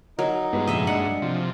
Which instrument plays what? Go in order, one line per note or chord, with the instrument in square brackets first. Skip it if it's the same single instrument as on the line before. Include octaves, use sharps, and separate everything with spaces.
[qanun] F#3 [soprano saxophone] D#4 [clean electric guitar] A#4
[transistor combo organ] G2 G#3 [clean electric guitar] B3 E4 B4
[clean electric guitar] C2 F2 A#2 [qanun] D#5 E5
[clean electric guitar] D4 [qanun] F#5
[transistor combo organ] C3 F3